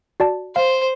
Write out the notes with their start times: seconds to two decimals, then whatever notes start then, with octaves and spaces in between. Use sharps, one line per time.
0.20 F#4 D5 A5
0.56 C5 F5